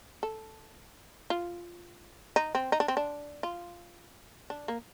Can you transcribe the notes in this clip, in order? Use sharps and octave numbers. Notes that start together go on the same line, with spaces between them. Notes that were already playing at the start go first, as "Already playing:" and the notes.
A4
F4
D#4
C4
D#4
D4
C4
D4
F4
D4
A#3